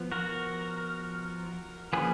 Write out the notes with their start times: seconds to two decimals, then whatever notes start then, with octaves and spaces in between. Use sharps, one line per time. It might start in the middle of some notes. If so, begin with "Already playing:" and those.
Already playing: F3 B3
0.12 F#4 A#4
1.93 F3 A#3 C#4 G#4 B4